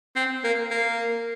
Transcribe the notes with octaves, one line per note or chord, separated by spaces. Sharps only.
C4
A#3
A#3